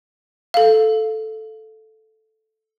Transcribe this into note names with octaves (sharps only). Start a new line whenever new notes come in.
A4 F5